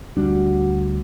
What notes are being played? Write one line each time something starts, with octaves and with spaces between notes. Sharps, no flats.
D2 G3 D4 F#4